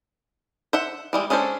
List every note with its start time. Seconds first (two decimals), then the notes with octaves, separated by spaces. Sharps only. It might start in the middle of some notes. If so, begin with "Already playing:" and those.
0.73 C5 E5 F#5
1.13 E3 G3 G#3
1.30 G#3 C#4 D4 A4 C5